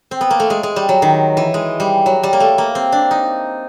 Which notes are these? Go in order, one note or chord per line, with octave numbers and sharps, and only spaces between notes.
C4
B3
A#3
A3
G#3
G#3
G3
F#3
D#3
E3
G#3
G3
F#3
G3
A#3
A3
A#3
C4
D4
D#4